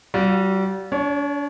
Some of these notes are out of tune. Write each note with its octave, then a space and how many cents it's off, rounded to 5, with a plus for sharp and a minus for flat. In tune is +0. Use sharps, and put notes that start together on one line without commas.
G3 -35 F4 +40
D4 -40 C#5 +10